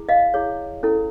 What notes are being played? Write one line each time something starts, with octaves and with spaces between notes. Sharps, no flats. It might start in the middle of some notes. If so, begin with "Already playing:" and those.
Already playing: E4 G#4
D#5 F5
E4 G#4 C#5
C#4 E4 A4